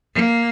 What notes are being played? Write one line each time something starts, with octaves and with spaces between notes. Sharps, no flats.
A#3